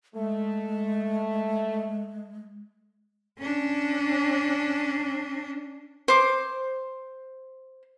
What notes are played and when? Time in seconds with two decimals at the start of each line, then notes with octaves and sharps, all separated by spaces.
0.15 G#3 A3
3.39 C#4 D4
6.08 C5 D6